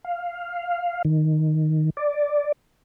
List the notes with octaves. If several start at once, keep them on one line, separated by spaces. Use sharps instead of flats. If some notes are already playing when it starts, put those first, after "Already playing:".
F5
D#3
D5